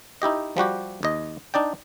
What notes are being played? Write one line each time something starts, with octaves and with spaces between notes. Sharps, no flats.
D#4 E4 G4 D#5
F3 G3 F#4 G4
D#2 D#5
D4 D#4 D5 G5